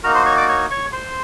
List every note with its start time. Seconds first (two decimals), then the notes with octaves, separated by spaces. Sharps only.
0.03 A#3 D#4 F#4 A#4 A#5
0.15 C5 C6
0.26 C#5 C#6
0.37 D5 D6
0.49 C#5 C#6
0.70 C#5 C#6
0.92 C5 C6